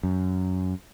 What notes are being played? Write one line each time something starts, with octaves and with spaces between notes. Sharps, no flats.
F#2